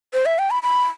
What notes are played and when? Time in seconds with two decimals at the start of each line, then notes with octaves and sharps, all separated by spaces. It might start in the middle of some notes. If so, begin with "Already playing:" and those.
0.14 C5
0.26 E5
0.39 G5
0.51 B5
0.63 B5